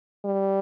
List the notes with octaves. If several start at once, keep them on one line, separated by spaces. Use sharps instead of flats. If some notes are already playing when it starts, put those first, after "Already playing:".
G3